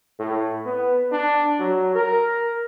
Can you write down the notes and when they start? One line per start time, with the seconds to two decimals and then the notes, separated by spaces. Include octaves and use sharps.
0.19 A2
0.66 B3
1.12 D4
1.60 F#3
1.95 A#4